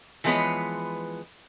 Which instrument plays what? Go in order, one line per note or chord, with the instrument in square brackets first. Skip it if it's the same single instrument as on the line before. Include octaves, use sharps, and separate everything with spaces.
[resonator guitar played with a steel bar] E3 F3 G#3 B3 B4 C#5